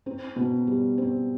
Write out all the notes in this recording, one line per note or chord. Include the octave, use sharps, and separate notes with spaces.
C4
B2
G3
C4